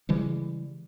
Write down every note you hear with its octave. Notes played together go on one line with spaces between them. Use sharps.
C#3 E3 G3 G#3